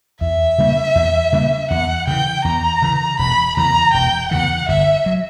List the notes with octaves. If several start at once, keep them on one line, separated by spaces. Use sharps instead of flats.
E2 E5
C#3 G3 A#3
E2
C#3 G3 A#3
E2 F#5
C#3 E3 G5
E2 A#5
C#3 E3
E1 B5
E2 C#3 E3 A#5
E1 G5
E2 C#3 E3 F#5
G1 E5
F#3